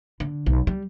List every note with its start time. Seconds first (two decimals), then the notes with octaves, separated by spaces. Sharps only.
0.20 D3
0.46 B1
0.67 G3